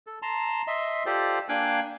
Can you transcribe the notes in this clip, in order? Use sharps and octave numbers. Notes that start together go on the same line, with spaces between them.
A4
A5 A#5 C6
D#5 E5 C6
F4 G4 A4 C5 D5
A#3 D4 F5 G5 G#5 F#6